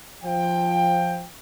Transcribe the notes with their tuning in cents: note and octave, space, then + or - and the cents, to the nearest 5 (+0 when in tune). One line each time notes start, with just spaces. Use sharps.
F3 +0 G5 +15